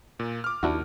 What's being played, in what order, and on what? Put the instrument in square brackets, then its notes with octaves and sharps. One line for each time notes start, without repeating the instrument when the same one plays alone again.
[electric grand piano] A#2
D6 F6
[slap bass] D#2 [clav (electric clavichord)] D4 E4 F#4